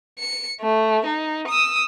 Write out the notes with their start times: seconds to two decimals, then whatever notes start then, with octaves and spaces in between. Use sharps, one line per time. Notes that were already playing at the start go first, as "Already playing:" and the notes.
0.19 C#7
0.61 A3
1.06 D#4
1.48 D#6 E6